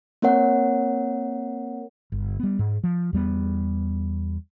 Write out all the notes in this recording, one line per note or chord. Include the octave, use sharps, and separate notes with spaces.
A#3 C4 A#4 C#5 F#5
G1
G3 B3
G#2
F3
E2 G3 B3